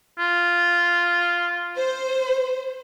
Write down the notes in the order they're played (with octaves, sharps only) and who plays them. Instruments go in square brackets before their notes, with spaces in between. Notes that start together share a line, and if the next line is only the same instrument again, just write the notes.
[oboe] F4
[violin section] C5